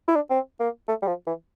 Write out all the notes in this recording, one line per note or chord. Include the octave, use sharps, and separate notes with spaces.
E4
D4
C4
A#3
A3
G3
F3
E3